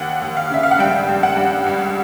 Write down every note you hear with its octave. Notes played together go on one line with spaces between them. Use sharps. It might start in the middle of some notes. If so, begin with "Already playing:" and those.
Already playing: D#2 F#5
D#2
F5
C#3 E5
F5
F#5
G2 G5
G2
F#5
G2
C#2